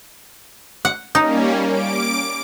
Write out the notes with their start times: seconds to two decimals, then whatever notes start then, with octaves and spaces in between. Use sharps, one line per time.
0.85 F#5
1.15 G3 A#3 C#4 D#4
1.68 D6 D7